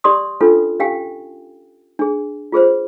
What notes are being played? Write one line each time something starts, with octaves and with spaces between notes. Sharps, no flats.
G4 D5 C6 D#6
C#4 D4 F4 A4 B4
C#4 G4 F5 G5 G#5
D4 G#4
F4 G#4 B4 C5